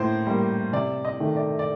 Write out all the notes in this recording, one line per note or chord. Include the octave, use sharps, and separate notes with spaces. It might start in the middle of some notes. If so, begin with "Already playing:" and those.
Already playing: A2 A#3 C5
G3 A#3
C3 D5
D#5
D#3 A3
D5
D5